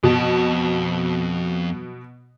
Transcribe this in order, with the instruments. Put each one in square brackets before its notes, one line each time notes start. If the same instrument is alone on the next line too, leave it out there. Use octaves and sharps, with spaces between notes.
[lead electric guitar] F2 A5 [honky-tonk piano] B2